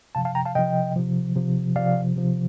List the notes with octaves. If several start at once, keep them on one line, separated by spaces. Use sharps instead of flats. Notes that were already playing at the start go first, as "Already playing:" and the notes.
C3 F3 F5 A5
F5 A5
G5 A#5
F5 A5
C3 F3 D#5 G5
C3 F3
C3 F3
C3 F3 D5 F5
C3 F3